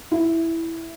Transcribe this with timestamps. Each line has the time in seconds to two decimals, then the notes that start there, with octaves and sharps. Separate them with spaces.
0.11 E4